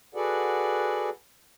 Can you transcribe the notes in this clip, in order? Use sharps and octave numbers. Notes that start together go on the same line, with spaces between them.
F#4 G#4 A4 B4 D5 F#5